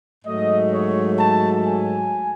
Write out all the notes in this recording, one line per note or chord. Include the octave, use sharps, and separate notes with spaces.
G#2 F#3 A3 D#5
C#5
A5
G#5